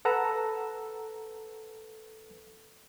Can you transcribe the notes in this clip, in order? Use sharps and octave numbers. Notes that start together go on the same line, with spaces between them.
A4 B4 F#5 A#5 E6